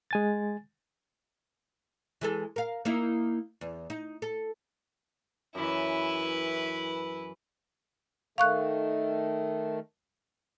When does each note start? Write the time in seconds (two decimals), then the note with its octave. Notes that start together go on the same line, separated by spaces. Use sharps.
0.11 G#3 G#5 A6
2.21 E3 G#3 A4
2.56 A#4 F5
2.85 A#3 D#4 E4
3.61 E2
3.90 D#4
4.22 A4
5.55 F#2 E3 E4 B4
8.38 D#3 A3 F5 C#6 F#6